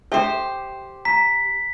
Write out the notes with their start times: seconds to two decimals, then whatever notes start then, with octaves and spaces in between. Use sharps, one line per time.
0.12 G4 A4 C5 E5 G5
1.05 A#5 B6